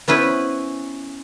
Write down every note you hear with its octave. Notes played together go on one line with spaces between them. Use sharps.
B3 C#4 E4 B4 C5